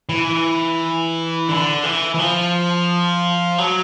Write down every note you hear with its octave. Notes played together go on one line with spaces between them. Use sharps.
E3
D3
E3
E3
F3
F#3